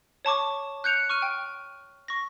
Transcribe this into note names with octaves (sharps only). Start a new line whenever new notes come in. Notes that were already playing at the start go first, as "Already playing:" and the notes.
C#5 A5 C#6 D6
F#6 G6 C#7 F7
C#6 F6 D#7
G5
C#6 A#6